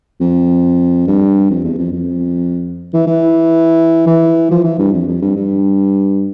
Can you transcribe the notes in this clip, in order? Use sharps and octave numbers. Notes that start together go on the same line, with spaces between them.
F2
G2
F2
E2
F2
F2
E3
E3
E3
F3
E3
G2
F2
F2
G2
G2